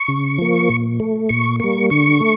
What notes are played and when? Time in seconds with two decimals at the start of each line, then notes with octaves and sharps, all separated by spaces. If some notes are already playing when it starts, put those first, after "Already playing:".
Already playing: C#6
0.08 C#3
0.38 F3 A#3
0.69 A#2
1.00 A3
1.29 A#2 C#6
1.60 G3 A#3 C#6
1.90 D3 C#6
2.20 A3